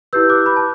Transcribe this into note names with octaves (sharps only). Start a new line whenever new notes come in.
E4 G4 B4 E6 G6
D6 F#6
B5 D6
A5